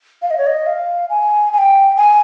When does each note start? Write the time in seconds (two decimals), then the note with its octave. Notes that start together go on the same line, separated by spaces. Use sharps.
0.22 F5
0.30 D#5
0.38 C#5
0.46 D#5
0.66 F5
1.10 G#5
1.53 G#5
1.58 G5
1.97 G#5